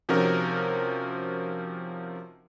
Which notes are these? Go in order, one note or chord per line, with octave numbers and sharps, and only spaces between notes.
C3 F3 C#4 D#4 F#4 A#4